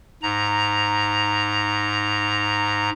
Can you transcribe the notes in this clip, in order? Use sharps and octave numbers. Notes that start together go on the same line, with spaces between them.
G#2 A#5